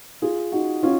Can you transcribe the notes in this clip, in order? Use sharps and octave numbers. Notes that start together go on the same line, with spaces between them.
F4 G#4
D#4 F#4
C#4 F4